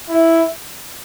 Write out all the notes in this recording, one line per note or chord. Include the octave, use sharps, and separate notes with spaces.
E4